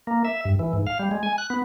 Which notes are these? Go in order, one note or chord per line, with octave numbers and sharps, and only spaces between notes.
A#3
E5
G2
E3
G#2
F5
G3
G#3
G#5
F#6
B3